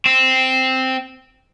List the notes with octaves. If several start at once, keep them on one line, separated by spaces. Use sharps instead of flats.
C4